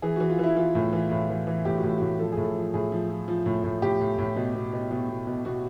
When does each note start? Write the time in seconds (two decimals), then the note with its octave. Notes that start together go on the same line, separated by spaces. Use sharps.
0.02 E3 G#4
0.16 E3 F#4
0.30 F4
0.39 E3 E4
0.56 E3 F4
0.75 A2
0.93 E3
1.11 A2
1.29 E3
1.47 E3
1.65 A2 G4
1.76 F#4
1.83 A2 F4
1.97 A2 F#4
2.19 F3 A4
2.32 G#4
2.37 A2
2.44 A4
2.56 F3
2.74 A2 G#4
2.92 F3
3.10 F3
3.28 F3
3.46 A2
3.64 A2
3.82 A2 G4
4.00 A2
4.18 A2
4.36 B2
4.54 B2
4.73 B2
4.91 B2
5.09 B2
5.27 B2
5.45 B2 F#4